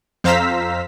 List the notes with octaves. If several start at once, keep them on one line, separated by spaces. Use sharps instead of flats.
F2 C5 F5 A#5 E6 B6